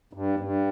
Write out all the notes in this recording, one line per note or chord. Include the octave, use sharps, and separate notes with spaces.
G2
G2